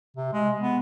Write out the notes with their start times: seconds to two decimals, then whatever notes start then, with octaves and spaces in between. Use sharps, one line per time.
0.17 C3
0.33 G#3
0.61 B3